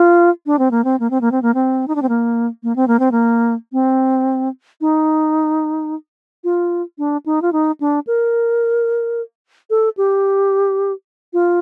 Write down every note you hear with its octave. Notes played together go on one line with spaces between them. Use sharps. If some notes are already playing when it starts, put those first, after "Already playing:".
Already playing: F4
D4
C4
A#3
C4
A#3
C4
A#3
C4
A#3
C4
D#4
D4
C4
A#3
A#3
C4
A#3
C4
A#3
C4
D#4
F4
D4
D#4
F4
D#4
D4
A#4
A4
G4
F4